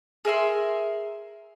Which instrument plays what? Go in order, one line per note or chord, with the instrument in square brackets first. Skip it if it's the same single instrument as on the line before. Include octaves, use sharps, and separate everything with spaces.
[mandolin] G#4 A#4 E5 C6